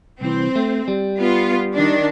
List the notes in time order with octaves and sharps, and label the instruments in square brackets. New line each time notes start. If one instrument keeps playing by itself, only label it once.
[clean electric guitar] C2 E3 [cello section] C4
[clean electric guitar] A3
G3
[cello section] B3 F4
D#3 D4